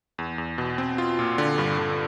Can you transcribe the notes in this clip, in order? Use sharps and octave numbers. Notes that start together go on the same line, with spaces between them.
E2
E2
B2
C4
F4
A#2
D3
G2
D3